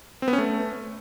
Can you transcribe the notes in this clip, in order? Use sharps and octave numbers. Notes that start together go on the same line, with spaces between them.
C4
B3
C#4
A3